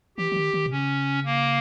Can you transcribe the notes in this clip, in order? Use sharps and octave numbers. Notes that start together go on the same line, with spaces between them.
E3 G4
E3
D#3
D#3
B2
C#3 C#4
A#3